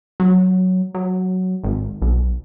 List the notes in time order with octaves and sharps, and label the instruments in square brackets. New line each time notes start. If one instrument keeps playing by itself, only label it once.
[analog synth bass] F#3
F#3
G#1
B1